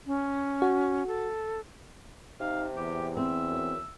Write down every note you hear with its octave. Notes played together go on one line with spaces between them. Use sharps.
C#4
F#4
A4
C3 D#4 F5
E2 G4
C4 E5
F#2